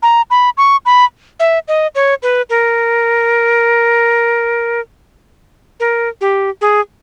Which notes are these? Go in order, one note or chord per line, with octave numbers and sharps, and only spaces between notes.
A#5
B5
C#6
B5
E5
D#5
C#5
B4
A#4
A#4
G4
G#4